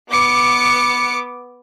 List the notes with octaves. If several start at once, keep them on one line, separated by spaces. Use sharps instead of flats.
B3 D6 C#7